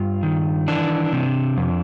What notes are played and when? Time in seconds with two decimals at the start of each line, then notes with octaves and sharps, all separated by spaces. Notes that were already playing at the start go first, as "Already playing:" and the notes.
Already playing: G2 F4
0.23 D#3
0.68 E3 D4
1.13 C3
1.57 F2